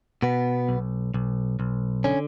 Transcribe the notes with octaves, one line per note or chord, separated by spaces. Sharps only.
B2 B3
B1
B1
B1
D3 C#4